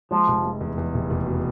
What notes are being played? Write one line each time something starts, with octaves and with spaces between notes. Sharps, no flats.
F3 G#3
F1
G#3
E2
E2
F1
F1
B2